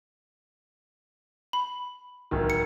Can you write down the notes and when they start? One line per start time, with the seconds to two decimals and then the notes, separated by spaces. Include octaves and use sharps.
1.53 B5
2.31 D1 D#3
2.50 C#7